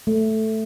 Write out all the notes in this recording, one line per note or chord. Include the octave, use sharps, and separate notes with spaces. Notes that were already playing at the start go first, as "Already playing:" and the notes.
A3